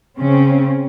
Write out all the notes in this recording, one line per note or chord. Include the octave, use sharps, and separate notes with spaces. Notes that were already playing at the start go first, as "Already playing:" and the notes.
C#3 C4 C#4